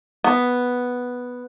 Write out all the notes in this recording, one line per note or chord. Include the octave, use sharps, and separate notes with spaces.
B3